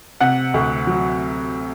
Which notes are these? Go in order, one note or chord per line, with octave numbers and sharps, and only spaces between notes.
C3 F#5
D2
F#3